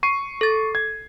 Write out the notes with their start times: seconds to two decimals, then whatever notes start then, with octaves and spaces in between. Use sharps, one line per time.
0.03 C#6 C7 D#7
0.41 A4 A6
0.75 G#6